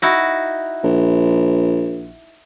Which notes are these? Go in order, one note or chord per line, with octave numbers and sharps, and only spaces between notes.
D#4 E4 F#4
A#1